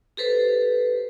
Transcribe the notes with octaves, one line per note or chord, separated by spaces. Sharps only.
G4 A4 B4 C5